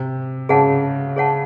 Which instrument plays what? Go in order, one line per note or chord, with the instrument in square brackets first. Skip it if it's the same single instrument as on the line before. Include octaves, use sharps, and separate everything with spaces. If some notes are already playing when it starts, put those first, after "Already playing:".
Already playing: [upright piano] C3
[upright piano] C#3 [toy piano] G#4 C#5 F#5 A5
[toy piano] G#4 C#5 F#5 A5